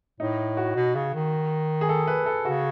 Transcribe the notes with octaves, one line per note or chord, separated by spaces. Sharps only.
A2 D#4
F#4
B2
C#3
D#3
G#4
A4
B4
A4
C#3 F#4